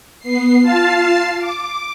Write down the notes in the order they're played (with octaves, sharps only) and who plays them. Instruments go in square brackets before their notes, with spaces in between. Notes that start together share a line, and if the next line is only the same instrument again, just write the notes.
[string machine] B3 C7
F4 F5 A5 A6 C7
D6